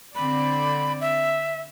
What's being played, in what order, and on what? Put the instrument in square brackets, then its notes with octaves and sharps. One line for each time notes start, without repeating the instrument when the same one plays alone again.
[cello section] D3 C4 D5 [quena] B5
[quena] E5